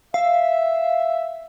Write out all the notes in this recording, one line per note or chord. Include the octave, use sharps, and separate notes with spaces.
E5 F5